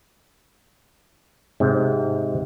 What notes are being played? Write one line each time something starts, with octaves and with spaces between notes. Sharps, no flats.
G#2 C3